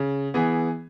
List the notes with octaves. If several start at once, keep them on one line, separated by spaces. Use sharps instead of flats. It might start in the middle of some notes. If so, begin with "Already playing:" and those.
Already playing: C#3
E3 B3 G#4